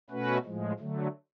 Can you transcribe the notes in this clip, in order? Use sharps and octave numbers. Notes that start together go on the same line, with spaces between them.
B2 A3 C#4 F#4 B4
A2 F3 G#3
D3 F#3 A3